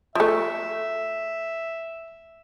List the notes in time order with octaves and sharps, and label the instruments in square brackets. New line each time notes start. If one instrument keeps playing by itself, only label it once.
[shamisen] F3 A3 [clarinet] E5